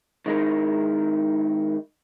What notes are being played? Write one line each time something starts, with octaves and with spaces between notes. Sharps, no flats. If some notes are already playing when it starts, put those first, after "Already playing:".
D#3 G#3 D#4 E4 A#4